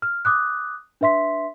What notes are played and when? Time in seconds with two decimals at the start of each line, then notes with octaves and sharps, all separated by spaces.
0.02 F6
0.25 D6 D#6 F#6
1.01 D4 B4 E5 C6 B6